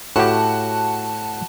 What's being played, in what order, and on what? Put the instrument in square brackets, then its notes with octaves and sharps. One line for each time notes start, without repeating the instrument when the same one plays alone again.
[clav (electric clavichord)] A2 G4 [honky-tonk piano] F#4 [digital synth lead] A5